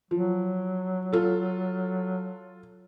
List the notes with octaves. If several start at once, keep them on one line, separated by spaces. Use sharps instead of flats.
F3 F#3
F4 A4